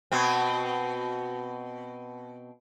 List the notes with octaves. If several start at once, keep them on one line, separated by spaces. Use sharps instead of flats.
B2 C4